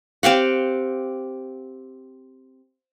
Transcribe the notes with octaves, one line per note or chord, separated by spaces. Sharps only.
C4 G4 F5 F#5